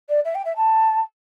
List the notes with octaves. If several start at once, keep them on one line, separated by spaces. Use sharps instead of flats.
D5
E5
G5
E5
A5